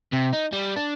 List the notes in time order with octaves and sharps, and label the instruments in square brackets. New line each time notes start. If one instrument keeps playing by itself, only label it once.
[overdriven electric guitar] C3
D#4
G3
D4